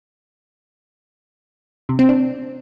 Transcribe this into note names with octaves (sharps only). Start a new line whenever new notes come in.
C3
C4
D4